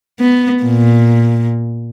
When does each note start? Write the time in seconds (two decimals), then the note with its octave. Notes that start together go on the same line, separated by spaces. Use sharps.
0.20 B3
0.63 A#2